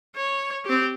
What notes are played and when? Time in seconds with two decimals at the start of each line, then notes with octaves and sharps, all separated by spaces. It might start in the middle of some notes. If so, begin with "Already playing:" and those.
0.16 C#5
0.65 C4 G4